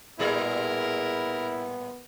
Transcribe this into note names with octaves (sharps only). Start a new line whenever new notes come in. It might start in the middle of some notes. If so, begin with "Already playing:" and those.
A2 G3 B3 E4 G#4 A#4